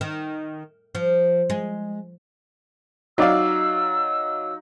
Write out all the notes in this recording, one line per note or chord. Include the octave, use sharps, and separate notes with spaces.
D#3
F3
G#3
F#3 D#4 D5 F5 E6